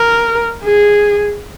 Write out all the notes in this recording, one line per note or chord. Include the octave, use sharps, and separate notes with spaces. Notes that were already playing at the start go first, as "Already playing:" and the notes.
Already playing: A#4
G#4